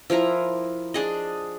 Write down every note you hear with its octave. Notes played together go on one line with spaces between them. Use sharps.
F3 E4 A#4 A#5
D4 G#4 D#5